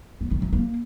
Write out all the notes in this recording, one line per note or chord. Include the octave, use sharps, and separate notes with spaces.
B3
D#3
F#3
A#3